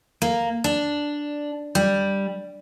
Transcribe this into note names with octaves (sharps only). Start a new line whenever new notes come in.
A#3
D4
G3